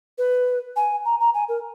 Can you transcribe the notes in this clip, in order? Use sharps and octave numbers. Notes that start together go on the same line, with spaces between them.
B4
G#5
A#5
A#5
G#5
A#4